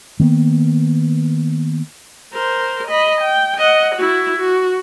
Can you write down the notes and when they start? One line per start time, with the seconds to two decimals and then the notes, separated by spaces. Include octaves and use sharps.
0.19 D#3 A#3 B3
2.33 A#4 C5
2.87 D#5 B5
3.20 G5
3.57 D#5 F#5
3.95 E4 F#4
4.37 F#4